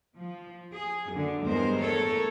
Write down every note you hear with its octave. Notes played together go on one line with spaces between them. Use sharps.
F3
G#4
F#2 D3
E2 G2 G#3 A#4 C5
A3 A4 A#4 C#5